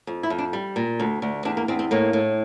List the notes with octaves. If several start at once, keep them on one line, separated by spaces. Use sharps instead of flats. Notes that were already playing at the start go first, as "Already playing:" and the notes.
F2
E4
F2
D4
G3
A#2
D2
D2
E2 D4
A#3
E2 C4
C4
A2 A#3
A2